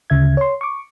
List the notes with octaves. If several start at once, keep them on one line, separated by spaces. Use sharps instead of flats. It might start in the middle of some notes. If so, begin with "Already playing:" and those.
D2 C#3 E5 G#6
C#5 C6
C#6 D6